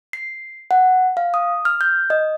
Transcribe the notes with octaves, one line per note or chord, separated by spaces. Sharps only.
C7
F#5
F5
D#6
F6
G6
D#5